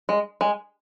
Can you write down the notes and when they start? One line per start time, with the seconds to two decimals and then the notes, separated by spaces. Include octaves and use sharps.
0.09 G#3
0.41 G#3